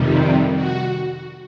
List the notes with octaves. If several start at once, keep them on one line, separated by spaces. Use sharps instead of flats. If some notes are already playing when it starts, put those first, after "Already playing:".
Already playing: F2 C3 D#3 G3
F#4